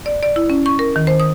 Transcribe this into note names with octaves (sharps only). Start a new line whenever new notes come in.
D5
D5
E4
C#4
C#6
A#4
D#3
C5
D#6